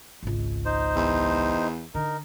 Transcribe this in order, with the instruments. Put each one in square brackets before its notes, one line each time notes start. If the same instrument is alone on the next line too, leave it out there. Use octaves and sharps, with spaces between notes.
[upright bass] G#1 C#2
[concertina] D#4 C5
[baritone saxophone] E2
[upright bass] D3 [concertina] D#4 A#4